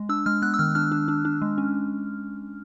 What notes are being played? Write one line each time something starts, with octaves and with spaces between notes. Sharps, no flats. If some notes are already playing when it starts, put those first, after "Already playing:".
Already playing: G#3
D4 E6
G#3 F6
B3 F#6
E6
D#3 F6
D4 F6
D4
D4
D4
G#3
C#4